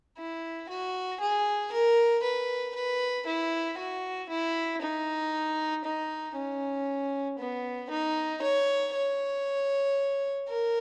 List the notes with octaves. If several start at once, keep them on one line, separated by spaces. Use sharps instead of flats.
E4
F#4
G#4
A#4
B4
B4
E4
F#4
E4
D#4
D#4
C#4
B3
D#4
C#5
C#5
A#4